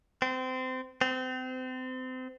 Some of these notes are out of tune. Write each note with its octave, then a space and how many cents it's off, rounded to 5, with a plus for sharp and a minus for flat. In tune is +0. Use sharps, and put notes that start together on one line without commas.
C4 -25
C4 -30